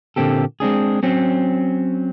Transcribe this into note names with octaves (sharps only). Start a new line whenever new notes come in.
A#2 D3 A#3 C4 G4 A4
G#3 C4 D4 G#4
F#3 C4 C#4